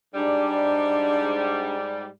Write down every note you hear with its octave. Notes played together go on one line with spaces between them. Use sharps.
G#2 G3 D4